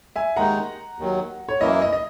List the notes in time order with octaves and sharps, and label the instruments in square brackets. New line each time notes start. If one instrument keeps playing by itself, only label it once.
[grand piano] E5 G#5
[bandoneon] D#2 D#3 G#3 D#4 [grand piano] F#5 A#5
[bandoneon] D#2 D#3 F#3
[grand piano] C#5
[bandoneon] F#2 E3 A#3 E4 [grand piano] D#5
[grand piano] D#5
D#5